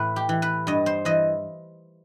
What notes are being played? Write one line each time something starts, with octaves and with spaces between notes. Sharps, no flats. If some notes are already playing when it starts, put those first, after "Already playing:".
Already playing: A2 E3 B4
G4
E3
B4
G2 D#5
C5
E3 D#5